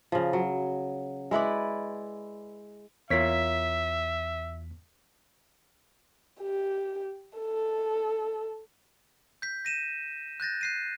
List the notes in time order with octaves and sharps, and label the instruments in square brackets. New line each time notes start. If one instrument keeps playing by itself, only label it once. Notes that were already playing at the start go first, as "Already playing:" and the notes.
[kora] C#3 F3
F#3
G#3 E4 B4 D5
[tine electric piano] E2 B6 [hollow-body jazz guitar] F4 A#4 C#5 [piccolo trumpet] E5
[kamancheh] G4
A4
[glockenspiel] G6 B6
A#6 D#7 E7
F#6 G6 A6 A#6
F#6 C7 D#7